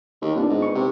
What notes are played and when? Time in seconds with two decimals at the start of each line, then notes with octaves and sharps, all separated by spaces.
0.22 D#2
0.36 C2 B3 D4 F4
0.50 G#2
0.62 B4 C#6
0.75 C3